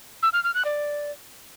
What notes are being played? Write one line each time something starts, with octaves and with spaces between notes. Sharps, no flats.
E6
F6
F6
F#6
D5